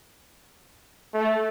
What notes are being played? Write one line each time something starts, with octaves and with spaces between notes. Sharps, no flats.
A3